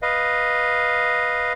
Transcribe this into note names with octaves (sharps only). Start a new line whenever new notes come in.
B4 D#5 F5